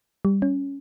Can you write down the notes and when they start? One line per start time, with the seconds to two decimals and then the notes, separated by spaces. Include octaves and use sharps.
0.25 G3
0.42 C#4